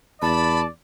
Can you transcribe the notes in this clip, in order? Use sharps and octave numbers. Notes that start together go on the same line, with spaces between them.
E2 D5 A5 B5